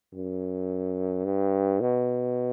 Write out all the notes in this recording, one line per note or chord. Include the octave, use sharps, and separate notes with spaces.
F#2
G2
B2